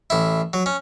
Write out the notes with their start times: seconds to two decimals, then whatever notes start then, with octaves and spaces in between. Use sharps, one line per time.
0.10 A1 E4
0.53 F#3
0.66 C#4